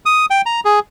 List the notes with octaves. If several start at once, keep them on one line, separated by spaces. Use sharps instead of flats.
D#6
G5
A#5
G#4